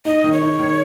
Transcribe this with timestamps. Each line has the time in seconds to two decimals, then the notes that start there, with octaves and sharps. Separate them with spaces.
0.05 D#4 D#5
0.24 D#3
0.32 C#5
0.42 D#4
0.59 D#3